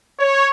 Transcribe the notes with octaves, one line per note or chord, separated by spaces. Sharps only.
C#5